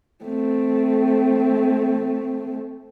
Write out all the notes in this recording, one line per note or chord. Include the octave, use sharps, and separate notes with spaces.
A3 C4